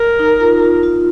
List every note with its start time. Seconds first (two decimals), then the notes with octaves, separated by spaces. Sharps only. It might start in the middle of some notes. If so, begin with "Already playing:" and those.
Already playing: A#4
0.19 D#4
0.40 F4
0.62 F4
0.83 F4